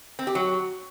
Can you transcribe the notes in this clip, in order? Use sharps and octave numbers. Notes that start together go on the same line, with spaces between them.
C4
G4
F#3